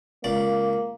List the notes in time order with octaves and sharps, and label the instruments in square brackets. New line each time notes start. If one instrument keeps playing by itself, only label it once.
[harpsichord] C#2 D5 [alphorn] A#3